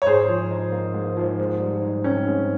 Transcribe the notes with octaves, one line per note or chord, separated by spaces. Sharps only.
C#5
G#2 G#4 C5
F3
D#4
A#3
G#2
F3
G#2
G3
D#4
C4 C#4
G#2